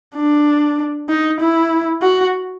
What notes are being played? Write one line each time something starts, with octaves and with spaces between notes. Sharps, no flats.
D4
D#4
E4
F#4